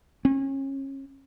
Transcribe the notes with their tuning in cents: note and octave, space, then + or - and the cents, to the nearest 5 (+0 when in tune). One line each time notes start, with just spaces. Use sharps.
C#4 -30